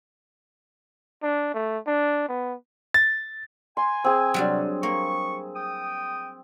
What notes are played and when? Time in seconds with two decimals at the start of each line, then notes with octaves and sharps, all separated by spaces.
1.23 D4
1.54 A3
1.87 D4
2.28 B3
2.94 A6
3.77 G#5 C6
4.04 C4 G#4
4.34 C3 F#3 G3 D4
4.83 A#3 C#6
5.56 G5 D#6